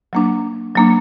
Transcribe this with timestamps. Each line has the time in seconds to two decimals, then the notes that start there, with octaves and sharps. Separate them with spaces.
0.13 F#3 A#3 D4
0.75 F#3 A#3 D4